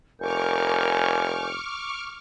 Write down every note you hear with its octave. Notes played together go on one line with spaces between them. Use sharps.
F1 A#4 G#5 C#6 D6 F6 G6